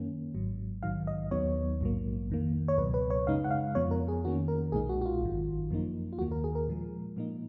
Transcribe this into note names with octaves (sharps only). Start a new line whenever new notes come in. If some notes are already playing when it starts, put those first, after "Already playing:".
Already playing: F#2 D#3 A#3 C#4
G#1 G#2 F#3
A#1 G#2 D#3 F#3 F5
D#5
D#2 D#3 F#3 B3 D#4 C#5
A#1 G#2 F#3 A#3
F2 D#3 A#3
C#5
C#2 B2 F#3 B4
B4
C#5
F#2 C#3 G#3 D#4 F5
F#5
F5
F2 F3 B3 C#5
A#4
G#4
F2 D#3 A#3 C#4 F#4
A#4
B1 A#2 G#3 D#4 G#4
F#4
F#4
F4
G#1 F#2 D#3
F#2 F3 A#3 D#4
F4
D#2 D#3 A#3 F#4
A#4
G#4
A#4
A#2 F3 G#3
A#2 F3 A#3 D#4